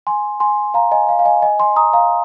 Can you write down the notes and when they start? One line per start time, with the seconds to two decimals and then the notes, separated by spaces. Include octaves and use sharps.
0.07 G#5 C6
0.40 G#5 C6
0.74 F5 A#5
0.92 D#5 G#5
1.09 F5
1.19 F5
1.25 D#5 G#5
1.42 D#5 G#5
1.60 G#5 C6
1.76 A#5 D#6
1.93 F5 A#5